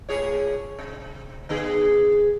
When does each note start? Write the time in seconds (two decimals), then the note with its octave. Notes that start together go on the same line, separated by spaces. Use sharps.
0.09 A2 G#4 C#5
0.79 C3
1.49 D3 B3 G#4